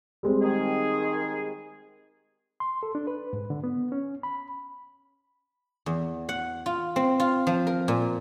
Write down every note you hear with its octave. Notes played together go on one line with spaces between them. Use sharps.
G3 G#3 C4
D#3 G#4
C6
A4
D4
B4
G#2
D3
B3
C#4
B5
E2
F#5
F4
C4
F4
F3
A#4
A#2